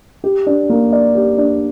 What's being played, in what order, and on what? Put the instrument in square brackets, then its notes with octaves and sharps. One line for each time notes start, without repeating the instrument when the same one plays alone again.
[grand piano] G4
D4
A#3
D5
G4
D4